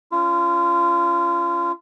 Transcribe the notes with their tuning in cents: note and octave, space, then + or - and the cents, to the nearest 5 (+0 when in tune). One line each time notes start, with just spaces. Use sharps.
C#4 +0 F4 -30